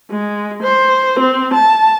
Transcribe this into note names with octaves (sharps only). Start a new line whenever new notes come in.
G#3
C5
C4
A5